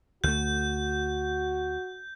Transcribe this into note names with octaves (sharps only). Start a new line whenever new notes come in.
D2 A3 F#4 G6